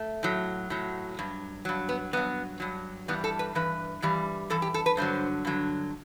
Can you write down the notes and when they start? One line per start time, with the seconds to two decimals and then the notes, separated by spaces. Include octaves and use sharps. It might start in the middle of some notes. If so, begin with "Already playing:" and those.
Already playing: A3
0.23 A2 F#3
0.70 A2 F#3
1.19 G2 F#3
1.65 G2 F#3
1.89 B3
2.13 G2 F#3 B3
2.60 G2 F#3
3.08 G2 E3 G3 B3
3.24 A4
3.39 B4
3.55 G2 E3 B4
4.02 G2 E3 G3
4.50 G2 E3 A4
4.62 G4
4.74 A4
4.86 B4
4.97 G2 D3 F#3 C5
5.45 G2 D3 F#3